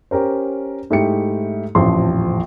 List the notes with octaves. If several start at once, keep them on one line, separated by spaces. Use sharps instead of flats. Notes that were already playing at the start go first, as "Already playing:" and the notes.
C#4 G4 A#4 C5
G#2 A3 E4 G4 C#7
D#1 A1 F2 F3 C6